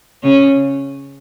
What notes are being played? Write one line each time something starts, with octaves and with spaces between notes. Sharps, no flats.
C#3 C#4